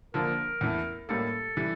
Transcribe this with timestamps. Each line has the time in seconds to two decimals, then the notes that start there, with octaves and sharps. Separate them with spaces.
0.14 D3 F3 A#3 A#4
0.61 E2 E3 A3
1.09 A2 G3 A#3 A4
1.57 E3 G3